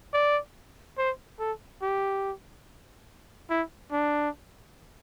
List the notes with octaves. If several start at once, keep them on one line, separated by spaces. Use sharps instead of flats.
D5
C5
A4
G4
E4
D4